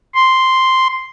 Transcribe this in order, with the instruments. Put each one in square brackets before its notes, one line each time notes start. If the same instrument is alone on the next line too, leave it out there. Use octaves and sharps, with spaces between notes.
[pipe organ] C6